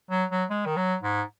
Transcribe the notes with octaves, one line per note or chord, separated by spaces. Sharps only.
F#3
F#3
G#3
D#3
F#3
G#2